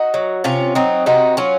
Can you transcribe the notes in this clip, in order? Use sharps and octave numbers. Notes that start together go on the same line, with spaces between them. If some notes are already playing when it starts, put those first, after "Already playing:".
Already playing: D#4 F#4
F#3
C3 C#4 F4
F#3 C4 D#4
C3 D#4 F#4
F#3 C#4 F4